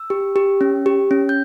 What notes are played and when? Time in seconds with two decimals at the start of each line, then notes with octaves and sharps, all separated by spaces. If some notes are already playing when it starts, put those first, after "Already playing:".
Already playing: E6
0.10 G4
0.36 G4
0.61 C#4
0.86 G4
1.11 C#4
1.29 G6